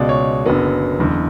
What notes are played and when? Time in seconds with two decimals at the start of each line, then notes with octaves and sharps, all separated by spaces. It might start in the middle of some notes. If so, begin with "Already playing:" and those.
Already playing: C#2 B2 G#3 D5
0.09 C#5
0.46 F#1 F#2 D3 F#3 B3
0.99 F#1 E2 D3